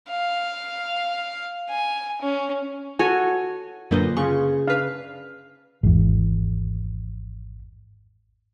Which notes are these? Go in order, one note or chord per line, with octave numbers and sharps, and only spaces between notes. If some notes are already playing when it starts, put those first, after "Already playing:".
F5
G#5
C#4
F#4 A4 C#5 G#5
F#2 A#2 D3 B4 C5 D#5
C#3 F4 G#4 C#6
D4 B4 F5
G#1 E2